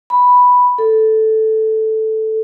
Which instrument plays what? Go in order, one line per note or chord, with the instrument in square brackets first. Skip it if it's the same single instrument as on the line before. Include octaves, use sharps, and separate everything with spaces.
[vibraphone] B5
A4